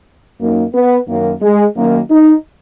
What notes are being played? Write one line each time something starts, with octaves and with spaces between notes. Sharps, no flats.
F#2 D#3 A#3
B3
F#2 D#3 A#3
G#3
F#2 D#3 A#3
D#4